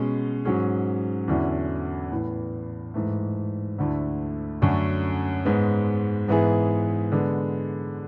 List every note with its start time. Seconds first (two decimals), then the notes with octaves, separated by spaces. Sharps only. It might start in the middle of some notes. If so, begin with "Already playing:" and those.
Already playing: B2 G#3 C#4
0.45 G#2 F#3 C#4 G#4
1.28 E2 D3 F#3 C#4 E4
2.12 A2 E3 B3
2.94 G#2 E3 A3
3.78 D2 D3 A3 E4
4.62 F#2 D3 A3 C#4 F#4
5.45 G#2 G#3 B3
6.28 G#2 E3 B3 E4 G#4
7.12 D3 G#3 B3